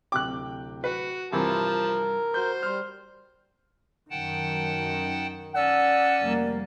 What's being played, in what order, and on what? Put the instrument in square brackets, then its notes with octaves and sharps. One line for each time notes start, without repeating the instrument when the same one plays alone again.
[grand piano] D1 C3 G5 [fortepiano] D6 F#6
[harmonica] F#4 [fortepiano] B4
[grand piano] G2 [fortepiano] C3 E3 [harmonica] F3 A5 [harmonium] A#4
[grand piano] F#4 G6 [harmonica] C5
[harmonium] G3 [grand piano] C6 F6
[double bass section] F#2 D#3 [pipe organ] F#5 G5 A5
[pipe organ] C#4 A5 E6 [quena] D5 [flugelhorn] F#5
[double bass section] F1 G3 A#3